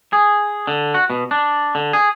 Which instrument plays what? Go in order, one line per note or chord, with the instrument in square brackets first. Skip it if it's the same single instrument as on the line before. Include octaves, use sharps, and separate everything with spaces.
[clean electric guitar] G#4
D3
F#4
B2
D4
D3
G#4